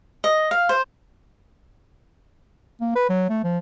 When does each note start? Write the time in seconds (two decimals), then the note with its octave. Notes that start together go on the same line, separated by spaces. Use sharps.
0.24 D#5
0.51 F5
0.69 C5
2.81 A#3
2.96 B4
3.10 F#3
3.30 A3
3.44 F3